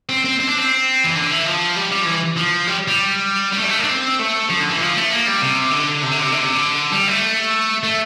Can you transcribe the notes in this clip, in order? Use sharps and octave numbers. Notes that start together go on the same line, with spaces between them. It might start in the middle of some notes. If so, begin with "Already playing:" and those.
C4
C4
C4
D4
C4
E3
D3
E3
F3
G3
G3
F3
E3
F3
G3
G3
G3
A3
G3
A3
A#3
D4
C4
A3
F3
D3
E3
F3
A3
A#3
G3
C3
D3
C3
D3
C3
D3
C3
D3
G3
A3
A3